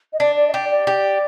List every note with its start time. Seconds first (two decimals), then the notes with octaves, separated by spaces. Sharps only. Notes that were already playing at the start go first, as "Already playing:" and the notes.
0.13 D#5
0.20 D4 D5
0.37 D5
0.48 D#5
0.53 G4 D5
0.71 D5
0.87 G4